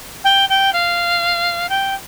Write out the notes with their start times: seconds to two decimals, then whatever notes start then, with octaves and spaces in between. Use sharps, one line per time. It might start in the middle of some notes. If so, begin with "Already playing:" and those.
0.24 G5
0.49 G5
0.73 F5
1.69 G5